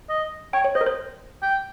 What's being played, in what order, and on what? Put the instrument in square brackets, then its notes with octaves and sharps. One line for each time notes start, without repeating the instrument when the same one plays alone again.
[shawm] D#5
[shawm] C#5 [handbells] G5
[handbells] C#5
[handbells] C5 [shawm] D#5
[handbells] A#4
C5
[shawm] G5